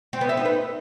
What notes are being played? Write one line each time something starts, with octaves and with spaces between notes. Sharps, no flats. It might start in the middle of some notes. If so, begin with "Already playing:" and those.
C4
B3
E5
D#4
B4